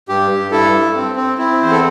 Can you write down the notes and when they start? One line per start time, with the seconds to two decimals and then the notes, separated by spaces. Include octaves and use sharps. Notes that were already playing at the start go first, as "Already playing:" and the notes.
0.09 G2 G4
0.31 G2
0.51 G2 E4 A4
0.73 G2
0.95 C4
1.16 C4
1.38 C4 E4
1.59 E2 C5
1.71 A4